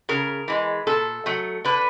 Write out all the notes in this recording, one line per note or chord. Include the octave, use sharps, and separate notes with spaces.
C#3 A#4
E3 G#3
A#2 A4
F#3 A3
D3 B4